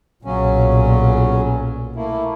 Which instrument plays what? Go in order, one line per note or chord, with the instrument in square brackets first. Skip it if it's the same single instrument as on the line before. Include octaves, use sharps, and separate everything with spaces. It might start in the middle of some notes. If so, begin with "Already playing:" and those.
[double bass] B1 A#2 [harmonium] C#3 F#3 C#4
[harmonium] A3 A#3 E4